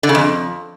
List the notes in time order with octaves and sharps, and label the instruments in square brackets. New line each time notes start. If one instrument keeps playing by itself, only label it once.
[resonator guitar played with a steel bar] D3
C#3
F2